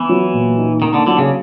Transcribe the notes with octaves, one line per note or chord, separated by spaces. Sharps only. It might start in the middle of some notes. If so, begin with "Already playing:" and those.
Already playing: E3 B3
F#3
A#2
D#4
D#3 A#3
D3
D3 F#3
C#3